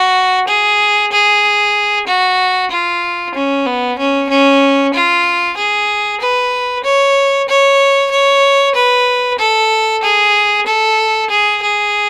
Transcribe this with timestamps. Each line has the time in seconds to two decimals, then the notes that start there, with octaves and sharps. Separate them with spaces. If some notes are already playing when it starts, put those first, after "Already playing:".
Already playing: F#4
0.48 G#4
1.12 G#4
2.07 F#4
2.71 F4
3.35 C#4
3.66 B3
3.98 C#4
4.30 C#4
4.94 F4
5.57 G#4
6.21 B4
6.84 C#5
7.49 C#5
8.11 C#5
8.75 B4
9.39 A4
10.03 G#4
10.67 A4
11.30 G#4
11.62 G#4